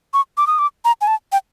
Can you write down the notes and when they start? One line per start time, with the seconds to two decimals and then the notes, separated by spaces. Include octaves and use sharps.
0.14 C#6
0.37 D6
0.47 D#6
0.59 D6
0.85 A#5
1.01 G#5
1.07 A5
1.32 G5